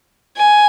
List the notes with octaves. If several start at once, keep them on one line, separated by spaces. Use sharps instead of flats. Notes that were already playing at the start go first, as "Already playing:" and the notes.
G#5